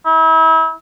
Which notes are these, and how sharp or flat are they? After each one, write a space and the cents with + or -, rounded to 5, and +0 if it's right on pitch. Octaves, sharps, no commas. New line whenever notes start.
E4 -35